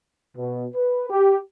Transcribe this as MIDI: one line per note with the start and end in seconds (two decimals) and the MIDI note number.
0.37 0.66 47
0.75 1.08 71
1.10 1.37 67